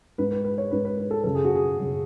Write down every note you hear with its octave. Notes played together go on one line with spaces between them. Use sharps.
G#2 B4
B4
B4
C#5
G#2 B4
B4
B4
A4
F#2 C#3 A4
G#4
F#4
G#4
F#2 C#3